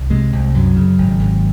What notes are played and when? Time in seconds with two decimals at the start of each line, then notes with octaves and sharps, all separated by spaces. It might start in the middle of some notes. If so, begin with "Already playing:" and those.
Already playing: C2
0.10 C3 G#3
0.33 C2
0.54 F#2 F#3
0.76 C#3
0.98 G#1
1.19 G#1